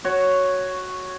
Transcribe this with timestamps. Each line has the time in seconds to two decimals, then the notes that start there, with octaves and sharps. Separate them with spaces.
0.05 F#4 C#5